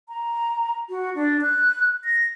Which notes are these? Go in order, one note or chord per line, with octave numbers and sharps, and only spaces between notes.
A#5
F#4
D4
F#6
A#6